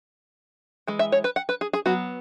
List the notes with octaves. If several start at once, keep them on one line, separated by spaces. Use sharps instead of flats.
E3 G#3
E5
C#5
B4
F#5
B4
G#4
G#4
F#3 B3 F#4